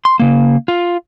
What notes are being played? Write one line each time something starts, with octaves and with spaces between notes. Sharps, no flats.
C6
C#3 A#3
F4